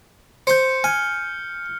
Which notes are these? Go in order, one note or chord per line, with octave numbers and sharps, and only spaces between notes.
C5 C6 G6 C#7
G#5 F6